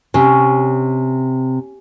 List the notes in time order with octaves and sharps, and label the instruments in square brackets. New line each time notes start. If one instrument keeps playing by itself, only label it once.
[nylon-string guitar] C3 [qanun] C#4